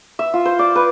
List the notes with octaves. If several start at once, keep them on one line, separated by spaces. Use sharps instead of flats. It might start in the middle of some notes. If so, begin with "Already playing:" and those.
E5
F4
C5
D5
B4